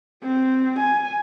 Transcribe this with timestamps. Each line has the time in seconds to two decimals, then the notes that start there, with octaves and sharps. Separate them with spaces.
0.23 C4
0.79 G#5